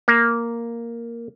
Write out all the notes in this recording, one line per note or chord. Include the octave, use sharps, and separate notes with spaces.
A#3